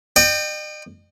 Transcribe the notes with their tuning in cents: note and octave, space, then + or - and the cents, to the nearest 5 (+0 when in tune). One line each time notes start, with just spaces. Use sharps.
D#5 -45 G5 +0